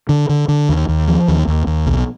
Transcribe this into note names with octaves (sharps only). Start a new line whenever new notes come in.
D3
D3
D3
D#2
D#2
F3
D#2
D#2
D#2
B1